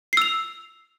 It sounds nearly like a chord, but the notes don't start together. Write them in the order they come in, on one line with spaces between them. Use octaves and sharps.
C7 E6 F7